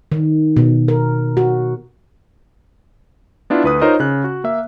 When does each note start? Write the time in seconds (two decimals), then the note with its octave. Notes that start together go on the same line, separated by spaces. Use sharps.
0.12 D#3
0.57 B2
0.88 A#4
1.37 F#4
3.50 B3 D4 E4 F4
3.64 D2 B4 D#6
3.82 D#4 F4 A#4 C5 C#5 D#5
4.00 C#3 F#6
4.24 F#4
4.44 A#3 E5